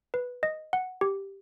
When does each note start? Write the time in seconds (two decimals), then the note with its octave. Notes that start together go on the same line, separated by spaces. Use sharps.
0.14 B4
0.43 D#5
0.73 F#5
1.01 G4